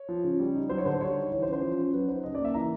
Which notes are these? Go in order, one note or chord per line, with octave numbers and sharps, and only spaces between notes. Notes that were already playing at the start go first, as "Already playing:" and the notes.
Already playing: C#5
F3
C#3
G3
D#4
F#3 C5
C#5
D3 C5
G3 C#5
D#4
E3 C#5
C5
C#4
C5
F3
C#4
F#3 B4
D#4 C5
C#3 D#5
D5
A#3
E5
E3 A#5